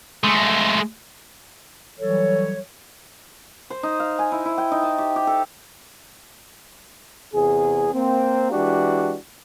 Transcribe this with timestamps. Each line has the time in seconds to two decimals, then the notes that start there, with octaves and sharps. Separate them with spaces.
0.24 G#3 A3
2.00 E3 F#3 G3 A4 C#5
3.70 C5
3.83 D#4
4.00 F5
4.19 G#5
4.32 E4
4.45 E4
4.58 G5
4.71 D#4
4.83 A5
4.98 G4
5.16 G4
5.27 A4
7.34 E2 C3 G#4
7.93 A#3 C4
8.52 E3 G#3 D4 F#4 G4